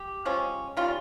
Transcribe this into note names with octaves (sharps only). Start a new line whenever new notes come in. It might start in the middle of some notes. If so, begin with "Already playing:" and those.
Already playing: G4
F3 G#3 C#4
D#3 G3 C#4 F4